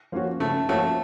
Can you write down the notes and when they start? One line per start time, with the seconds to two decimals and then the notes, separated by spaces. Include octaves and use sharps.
0.12 F3 A#3 C#4 F#4
0.40 C#3 A3
0.69 F3 A3 A#3 C#4 F#4